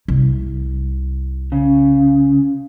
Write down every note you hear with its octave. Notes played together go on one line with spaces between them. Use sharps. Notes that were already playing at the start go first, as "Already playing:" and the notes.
C2
C#3